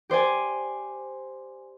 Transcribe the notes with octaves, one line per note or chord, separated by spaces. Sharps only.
G4 C5 D5 G#5